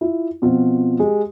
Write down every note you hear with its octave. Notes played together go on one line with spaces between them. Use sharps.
E4 F4
B2 F3 C4 F4
G#3 G4